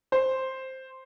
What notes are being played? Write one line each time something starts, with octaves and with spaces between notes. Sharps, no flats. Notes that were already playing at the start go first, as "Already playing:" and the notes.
C5